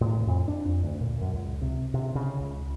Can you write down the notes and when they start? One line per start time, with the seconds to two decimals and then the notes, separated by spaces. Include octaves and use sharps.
0.01 A2
0.27 F2
0.48 D4
0.65 F2
0.83 D2
1.01 A#2
1.21 F#2
1.33 C#2
1.62 C3
1.94 C3
2.15 C#3
2.40 C#2